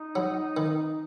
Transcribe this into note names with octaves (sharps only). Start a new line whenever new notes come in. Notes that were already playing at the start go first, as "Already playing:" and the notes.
Already playing: D#4
F#3
D#3